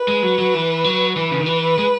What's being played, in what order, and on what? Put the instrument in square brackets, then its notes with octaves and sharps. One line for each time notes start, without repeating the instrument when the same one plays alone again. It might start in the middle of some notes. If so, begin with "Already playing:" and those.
Already playing: [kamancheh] B4
[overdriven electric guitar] G#3
F#3
F#3
E3
F#3
[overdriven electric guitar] E3 [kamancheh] B4
[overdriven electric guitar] C#3
D#3
E3
G#3